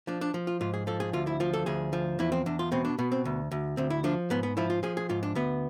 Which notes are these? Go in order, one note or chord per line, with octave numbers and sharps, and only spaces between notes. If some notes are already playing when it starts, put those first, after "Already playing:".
F3 D4
D4
F3
F4
G#2 F4
G#4
F3 A4
G#4
D2 F4
E4
F3 F4
A4
D2 G#4
F3
E2 E4
C4
E2 D4
F4
B2 C4
D4
B2 B3
C4
D2
D2
D2 C4
E4
F3 D4
G#2 B3
B3
F3 E4
F4
F3 G#4
G#4
G#2 F4
D4
D2 B3